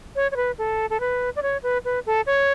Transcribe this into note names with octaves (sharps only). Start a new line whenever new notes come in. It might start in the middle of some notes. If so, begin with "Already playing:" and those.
C#5
C#5
B4
A4
A4
B4
D5
C#5
B4
B4
A4
C#5